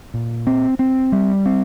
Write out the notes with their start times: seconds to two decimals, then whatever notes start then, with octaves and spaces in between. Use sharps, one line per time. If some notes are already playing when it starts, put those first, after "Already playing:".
0.14 A#2
0.47 C4
0.79 C4
1.12 G3
1.46 C4